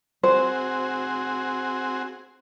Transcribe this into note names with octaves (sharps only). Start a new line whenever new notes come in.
C4 F#4 G#4 C5